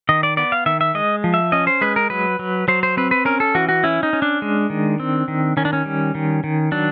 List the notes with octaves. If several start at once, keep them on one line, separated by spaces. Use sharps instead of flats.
D#3 D#5
D5
B3 D5
F5
D#3 E5
E5
G#3 D#5
F3
E5
C#4 D#5
C5
G#3 B4
A#4
F#3 B4
F#3
F#3 C5
C5
C4 B4
B4
C#4 A#4
A4
E3 F#4
F#4
C#4 E4
D#4
C#4
D4
G#3
D#3
C4
D#3
D#3 C#4
D4
C#4
G3
D#3
D#3
F#3 D4